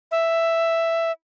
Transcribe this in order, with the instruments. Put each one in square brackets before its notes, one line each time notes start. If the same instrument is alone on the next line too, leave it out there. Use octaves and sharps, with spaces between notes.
[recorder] E5